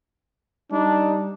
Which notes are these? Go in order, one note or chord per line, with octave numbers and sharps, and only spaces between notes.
G3 D4 D#4